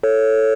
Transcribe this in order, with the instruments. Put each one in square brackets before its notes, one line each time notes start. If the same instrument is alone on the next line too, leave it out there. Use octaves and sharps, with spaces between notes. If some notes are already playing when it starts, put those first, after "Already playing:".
[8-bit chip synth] A4 C#5